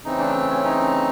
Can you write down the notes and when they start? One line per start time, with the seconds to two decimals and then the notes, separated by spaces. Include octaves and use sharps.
0.04 C#3 E3 A3 C4 D#4
0.19 D4
0.50 C#4
0.65 D#4